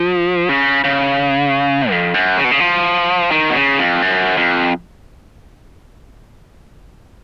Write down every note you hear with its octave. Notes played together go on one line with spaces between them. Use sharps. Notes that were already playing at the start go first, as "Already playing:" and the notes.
Already playing: F3
C#3
C#3
F2
F#2
C#3
B2
C#3
F3
D#3
B2
C#3
F2
F#2
F2